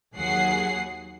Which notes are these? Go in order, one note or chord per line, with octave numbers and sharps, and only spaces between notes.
D#2 F#3 G#4 F#5 C7